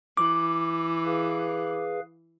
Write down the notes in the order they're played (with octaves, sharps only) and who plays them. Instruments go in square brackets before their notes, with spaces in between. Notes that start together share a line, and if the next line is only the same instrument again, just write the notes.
[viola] E3 [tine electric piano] D6
[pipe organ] G#4 B4 F5